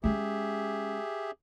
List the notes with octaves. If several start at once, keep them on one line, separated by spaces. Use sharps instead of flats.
G#3 C#4 G4 G#4 E5